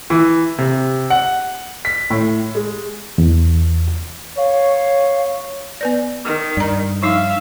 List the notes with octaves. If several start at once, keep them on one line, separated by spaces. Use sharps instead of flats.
E3
C3
F#5
B6
A2
G#3
E2
C#5 F5
B3 B4 D5
D#3
G2 D5 A#5
F3 D#4 E5 F5 D6